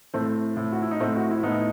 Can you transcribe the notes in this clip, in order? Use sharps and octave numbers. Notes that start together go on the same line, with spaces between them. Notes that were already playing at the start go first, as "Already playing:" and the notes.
A2 A3 C4
A2
F#4
E4
D#4
A2 A3 C4
F#4
E4
A2 B3 D#4